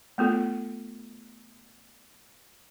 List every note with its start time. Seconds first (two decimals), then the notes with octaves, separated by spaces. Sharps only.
0.18 A3 B3 F4 A4